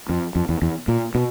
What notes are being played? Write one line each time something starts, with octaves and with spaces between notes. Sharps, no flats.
F2
F2
E2
E2
A#2
B2